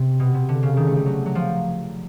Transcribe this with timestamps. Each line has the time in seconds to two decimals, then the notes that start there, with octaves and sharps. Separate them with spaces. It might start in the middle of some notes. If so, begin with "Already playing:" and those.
Already playing: C3
0.20 B2
0.34 C3
0.49 D3
0.63 C#3
0.77 D#3
0.87 A3
0.97 G3
1.06 F#3
1.26 F#3
1.35 F3